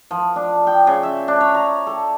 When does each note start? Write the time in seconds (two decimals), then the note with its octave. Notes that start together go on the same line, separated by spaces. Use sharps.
0.11 F3
0.36 D4
0.67 G5
0.87 C#3
1.03 E5
1.28 D4
1.41 C#5
1.54 A#5
1.87 A4